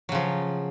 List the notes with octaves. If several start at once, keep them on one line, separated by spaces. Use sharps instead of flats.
C#3 F3 F#3